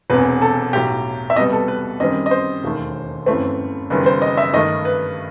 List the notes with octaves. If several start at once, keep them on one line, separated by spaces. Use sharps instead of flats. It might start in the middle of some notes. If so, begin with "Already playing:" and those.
E1 E2 C3 B4
A4
B1 A2 F#3 G4
E5
C2 B2 G3 B3 D#5
A4
B4
F#2 D#3 G3 C4 D#5
D#5
C5
E1 D#2 D#3 A3
G1 F#2 E3 A3 C4
F#1 F#2 D#3 G3 B3
C5
D#5
E5
G2 D#3 A3 D#5
B4